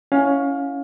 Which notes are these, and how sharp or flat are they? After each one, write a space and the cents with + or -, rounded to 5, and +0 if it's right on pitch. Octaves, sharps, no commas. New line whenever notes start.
C#4 +5 E4 +0 F5 +25